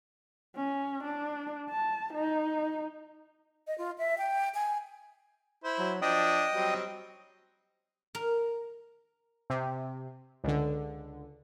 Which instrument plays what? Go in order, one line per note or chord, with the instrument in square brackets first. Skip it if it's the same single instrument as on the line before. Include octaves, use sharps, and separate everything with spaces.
[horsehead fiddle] C#4
D4
A5
D#4
[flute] D#5
F4
E5
G5
G#5
[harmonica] E4 C5 B5
[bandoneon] F#3
[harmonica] F3 D4 [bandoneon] D#5 G5 D#6
[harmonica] F#3 G3 C4
[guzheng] A#4
[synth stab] C3
C#2 D3